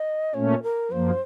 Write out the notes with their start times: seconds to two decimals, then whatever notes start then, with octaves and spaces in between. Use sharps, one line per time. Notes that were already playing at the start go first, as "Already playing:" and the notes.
Already playing: D#5
0.34 A#2 A3 C#4 C#5
0.63 A#4
0.91 F#2 F3 A#3 C5